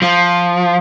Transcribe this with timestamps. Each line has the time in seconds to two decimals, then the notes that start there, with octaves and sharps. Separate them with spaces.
0.02 F3